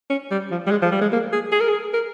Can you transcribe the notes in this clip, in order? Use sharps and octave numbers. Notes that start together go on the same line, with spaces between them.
C#4
G3
F3
G3
G#3
F3
G3
G#3
A#3
G#4
G#4
A#4
G#4
A#4